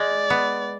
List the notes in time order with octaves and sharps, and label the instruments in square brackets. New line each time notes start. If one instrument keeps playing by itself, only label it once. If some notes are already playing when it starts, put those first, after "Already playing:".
Already playing: [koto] G#3 [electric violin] D5
[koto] B3